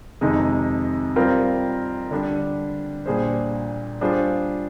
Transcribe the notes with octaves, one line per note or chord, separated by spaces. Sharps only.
F2 C3 D#3 G#3 D#4
G3 C4 F4 A#4
D3 G3 D4
A#2 G3 D4 G#4 C5
G3 D4 F4 G#4 C5